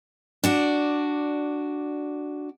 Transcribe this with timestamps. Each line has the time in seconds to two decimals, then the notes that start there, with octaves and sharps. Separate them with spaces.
0.44 D4 F#4 D5